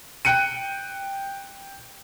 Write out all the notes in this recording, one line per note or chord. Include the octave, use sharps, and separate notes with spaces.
G5 F#6 C#7 D#7